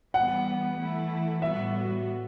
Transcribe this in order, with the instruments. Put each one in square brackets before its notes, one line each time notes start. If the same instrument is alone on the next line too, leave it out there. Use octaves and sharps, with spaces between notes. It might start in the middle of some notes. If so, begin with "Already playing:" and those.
[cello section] E3 G3 B3 [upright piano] F#5
[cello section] E3 A3 E4
[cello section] A2 G3 B3 F#4 [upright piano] E5